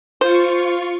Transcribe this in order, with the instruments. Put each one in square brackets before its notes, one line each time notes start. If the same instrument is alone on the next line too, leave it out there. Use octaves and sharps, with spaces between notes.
[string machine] F4 C#6 [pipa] C5